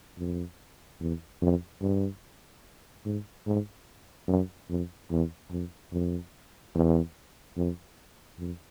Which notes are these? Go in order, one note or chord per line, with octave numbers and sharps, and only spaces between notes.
F2
E2
F2
G2
G#2
G#2
F#2
F2
E2
F2
F2
E2
F2
F2